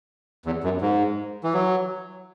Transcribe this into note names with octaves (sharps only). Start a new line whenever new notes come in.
E2
F#2
G#2
E3
F#3